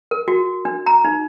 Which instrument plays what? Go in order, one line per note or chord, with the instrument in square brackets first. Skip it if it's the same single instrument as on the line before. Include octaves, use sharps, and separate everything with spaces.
[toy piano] A#4
F#4
D4
A#5
D#4